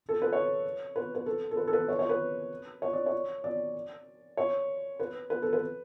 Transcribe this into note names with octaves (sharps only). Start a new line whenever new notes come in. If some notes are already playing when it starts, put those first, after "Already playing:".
A4
B4
C#5
B4
B4
A4
A4
B4
A4
B4
C#5
C#5
B4
C#5
D5
C#5
D5
C#5
B4
B4
A4
B4